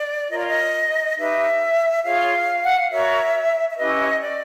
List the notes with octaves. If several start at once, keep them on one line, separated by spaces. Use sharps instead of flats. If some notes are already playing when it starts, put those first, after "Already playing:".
Already playing: D5
F4 A#4 C#5 D#5
D5
D#5
D#4 G4 B4 E5
F4 G#4 C#5 F5
F#5
F5
F#4 A#4 C#5 E5
E5
C#4 E4 G4 B4 D#5
D5